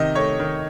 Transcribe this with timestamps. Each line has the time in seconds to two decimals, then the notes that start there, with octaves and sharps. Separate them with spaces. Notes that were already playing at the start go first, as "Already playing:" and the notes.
Already playing: C3 D#3 D#5
0.15 A3 C#5
0.40 D#3